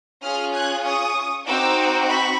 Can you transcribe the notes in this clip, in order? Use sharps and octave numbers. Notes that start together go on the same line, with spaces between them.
C#4 F4 G#4 D#6 F6
F#6 G#6
C#6 D#6
C4 D#4 F#4 D6 E6
B5 C#6